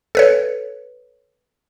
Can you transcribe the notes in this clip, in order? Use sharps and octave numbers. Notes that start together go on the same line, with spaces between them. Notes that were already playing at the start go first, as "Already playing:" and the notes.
A4 B4 C#5